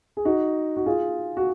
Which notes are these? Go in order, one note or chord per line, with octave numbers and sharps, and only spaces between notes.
G#4
D#4 F#4
F#4
F4 G#4
F#4